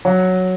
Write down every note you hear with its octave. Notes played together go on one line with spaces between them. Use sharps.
F#3